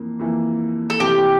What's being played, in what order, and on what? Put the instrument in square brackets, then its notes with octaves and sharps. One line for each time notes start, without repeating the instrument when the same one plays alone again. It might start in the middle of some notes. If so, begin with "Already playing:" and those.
Already playing: [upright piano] F2 E3 A#3
F2 E3 A#3
[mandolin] A4
[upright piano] F1 F2 E3 A3 C4 [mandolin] G4